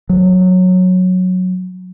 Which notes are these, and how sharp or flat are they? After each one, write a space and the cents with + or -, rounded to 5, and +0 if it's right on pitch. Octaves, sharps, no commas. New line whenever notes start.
F#3 -10